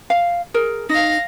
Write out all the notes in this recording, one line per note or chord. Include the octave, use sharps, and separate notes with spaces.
F5
G#4 A#4
D#4 F5 A#6